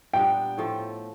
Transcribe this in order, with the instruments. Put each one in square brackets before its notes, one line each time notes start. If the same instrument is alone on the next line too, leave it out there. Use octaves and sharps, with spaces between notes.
[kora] A#2 G3 B3 D4 [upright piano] G5
[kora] A2 F3 A3